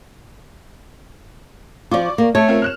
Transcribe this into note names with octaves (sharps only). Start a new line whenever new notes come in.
F3 F4 D5 C#6 D6
A#3
A3 C#5 A5
C4 F4 A#4
F6 F#6 E7